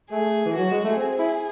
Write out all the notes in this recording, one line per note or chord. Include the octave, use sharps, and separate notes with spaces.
A3 G#4
E3
F#3 F#4
G#3
A3
C4 G#4
E4